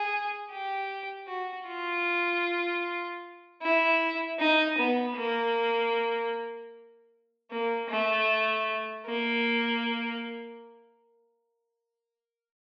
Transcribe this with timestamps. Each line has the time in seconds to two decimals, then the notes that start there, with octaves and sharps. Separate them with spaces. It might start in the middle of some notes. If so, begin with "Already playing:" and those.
Already playing: G#4
0.51 G4
1.28 F#4
1.68 F4
3.62 E4
4.40 D#4
4.79 B3
5.17 A#3
7.51 A#3
7.90 A3
9.07 A#3